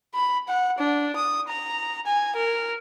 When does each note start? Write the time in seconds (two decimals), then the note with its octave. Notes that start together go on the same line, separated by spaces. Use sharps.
0.14 B5
0.48 F#5
0.78 D4
1.16 D#6
1.48 A#5
2.06 G#5
2.36 A#4